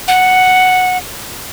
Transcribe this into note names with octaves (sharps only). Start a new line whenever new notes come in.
F#5